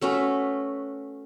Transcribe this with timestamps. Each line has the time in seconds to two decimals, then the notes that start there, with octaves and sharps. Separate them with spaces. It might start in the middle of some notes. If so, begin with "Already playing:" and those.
0.01 A3 C#4 F#4 B4